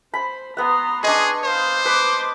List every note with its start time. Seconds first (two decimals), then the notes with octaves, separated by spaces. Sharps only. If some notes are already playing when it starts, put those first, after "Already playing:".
0.14 C5 B5
0.57 B3 F#5 A#5 C6
1.04 D4 G#4 D#5 C6 C#6
1.44 B4 C5 F5
1.85 B4 D6